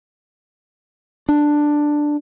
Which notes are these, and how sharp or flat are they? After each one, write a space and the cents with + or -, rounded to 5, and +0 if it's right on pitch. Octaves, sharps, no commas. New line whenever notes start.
D4 +5